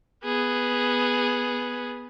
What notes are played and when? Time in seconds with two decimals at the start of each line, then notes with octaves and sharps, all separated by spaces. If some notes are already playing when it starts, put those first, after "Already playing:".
0.25 B3 G#4